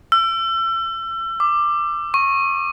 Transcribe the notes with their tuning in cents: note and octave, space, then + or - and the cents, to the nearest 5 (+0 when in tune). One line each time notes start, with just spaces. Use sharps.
E6 +35
D6 +15
C#6 -20